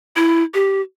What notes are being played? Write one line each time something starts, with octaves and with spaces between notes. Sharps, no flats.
E4
G4